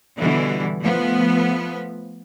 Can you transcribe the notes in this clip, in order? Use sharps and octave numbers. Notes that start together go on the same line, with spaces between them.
B2 D3 E3 G3
F3 A3 B3